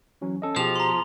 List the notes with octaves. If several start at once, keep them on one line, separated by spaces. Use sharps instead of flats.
E3 F#3 C#4
C#4 A4 D#5
B2 F3 G4 G#4 F7
A#5 C6